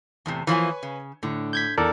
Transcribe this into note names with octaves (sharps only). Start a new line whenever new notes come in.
E2 A2 C3
E3 F3 A#3 B4 C#5 G#5
C#3
A2 D3
G6 G#6 B6
E2 A4 A#4 D5